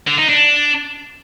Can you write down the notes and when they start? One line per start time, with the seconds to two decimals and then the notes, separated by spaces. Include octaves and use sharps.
0.07 D3
0.18 D#4
0.29 D4